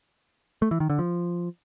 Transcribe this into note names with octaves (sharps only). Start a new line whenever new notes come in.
A3
E3
D#3
D3
F3